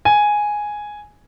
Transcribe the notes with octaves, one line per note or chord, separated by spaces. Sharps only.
G#5